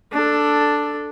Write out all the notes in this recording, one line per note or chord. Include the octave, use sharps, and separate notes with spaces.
D4 A4